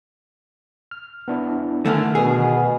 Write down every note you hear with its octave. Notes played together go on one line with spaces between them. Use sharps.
F6
B3 D4 E4
G2 D3 D#3 A3 G#5 F6
B2 G#4